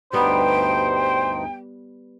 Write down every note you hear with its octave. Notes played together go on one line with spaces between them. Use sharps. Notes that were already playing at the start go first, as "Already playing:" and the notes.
D2 G2 G3 B3 D#4 C5 G5